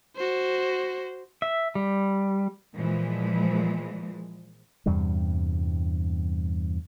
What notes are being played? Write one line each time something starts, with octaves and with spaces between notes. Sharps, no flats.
F#4 C5
E5
G3
A#2 E3 F3 G#3
E2 G2 C3 G3